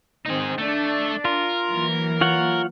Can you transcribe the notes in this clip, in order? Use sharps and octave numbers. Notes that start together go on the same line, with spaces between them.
D#3 C4 D#4 G#4
A3 D4
F4 A#4
E3 F#3 A#3
F4 C#5 F#5